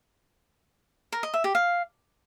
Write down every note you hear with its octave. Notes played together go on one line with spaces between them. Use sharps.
A#4
D#5
E5
G4
F5